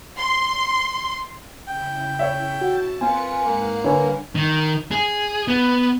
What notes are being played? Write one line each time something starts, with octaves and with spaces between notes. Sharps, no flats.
C6
C#3 E4 G5
C#5 E5
F#4 A5
C4 F4 A#4 B4 G#5 C#7
G#2 A#3 F5 F#5
D3 G3 A#4 B4 C#5 G#5
D#3
G#4
B3